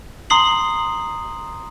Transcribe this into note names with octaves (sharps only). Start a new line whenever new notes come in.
A#5 C6 D#6 C7 F#7